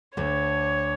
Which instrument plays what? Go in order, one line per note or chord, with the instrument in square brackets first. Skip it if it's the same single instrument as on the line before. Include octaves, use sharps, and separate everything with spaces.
[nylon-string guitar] D2 D3 [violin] C#5